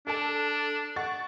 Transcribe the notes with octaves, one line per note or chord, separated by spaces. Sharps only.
D4 A4 A5
F#5 C#6 A6